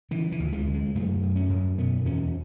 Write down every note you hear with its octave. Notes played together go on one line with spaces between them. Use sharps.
C#3 E3
E3
D2
G#3
C#3
G#3
F#2 A3
F#2
C#4
F#2
B2 B3
E2 C#4